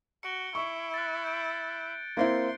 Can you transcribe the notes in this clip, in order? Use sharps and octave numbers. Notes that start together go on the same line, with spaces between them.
F#4 C#7 D7 G7
E4 C#6
F#6 A6
G6 D7
A#3 C4 E4 C6